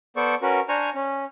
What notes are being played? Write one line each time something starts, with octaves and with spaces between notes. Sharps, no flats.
B3 A4 C5 D5 C#6
C#4 F#4 A#4 B4
D4 C5 G#5 A#5 C#6 F6
C#4